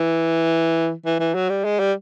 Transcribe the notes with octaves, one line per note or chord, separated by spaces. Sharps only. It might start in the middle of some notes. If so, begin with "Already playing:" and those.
Already playing: E3
E3
E3
F#3
G3
G#3
G3